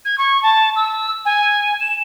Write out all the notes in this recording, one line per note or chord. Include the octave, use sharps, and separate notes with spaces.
G#6
C#6
A5
E6
G#5
E7